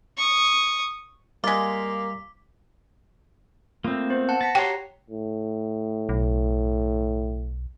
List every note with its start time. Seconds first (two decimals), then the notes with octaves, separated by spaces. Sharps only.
0.17 C#6 D#6
1.44 G3 G#3 A#3 F4 D6 B6
3.84 A3 A#3 C4 F4
4.10 B3 C5
4.29 F#5 A5 F#6
4.41 A5 A#6 B6 C#7
4.55 F#4 G4 C#5 G5 A#5 C6
5.10 A2
6.09 B1